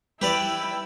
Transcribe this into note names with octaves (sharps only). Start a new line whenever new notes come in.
G3 E4 G4 B4 D5 G5 E6